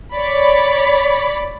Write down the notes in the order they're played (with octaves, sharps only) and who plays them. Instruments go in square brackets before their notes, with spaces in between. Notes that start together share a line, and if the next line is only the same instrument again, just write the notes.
[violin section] C#5 D5 B5